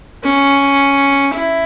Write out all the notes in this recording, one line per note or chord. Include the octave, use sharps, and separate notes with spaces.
C#4
E4